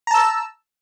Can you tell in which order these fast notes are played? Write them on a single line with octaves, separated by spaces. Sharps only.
A#5 A5 E6